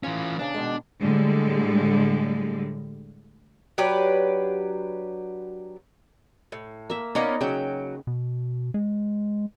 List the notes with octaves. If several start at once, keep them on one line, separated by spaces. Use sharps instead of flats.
E3 C#4 F4
E2 C#3 D4
B2 D#3 G#3
A2 D3 G3 G#3
F#3 D4 G4 B4
A2
A#3 E5
A#3 B3 C#4 D#4 D5 D#5
C#3 F#3 G5
B2
G#3